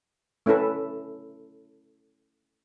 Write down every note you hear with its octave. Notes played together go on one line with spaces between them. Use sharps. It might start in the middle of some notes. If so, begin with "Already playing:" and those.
A3 C#4 E4 A4 B4